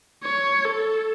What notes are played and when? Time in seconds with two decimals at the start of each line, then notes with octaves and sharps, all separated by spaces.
0.23 C#5
0.65 A4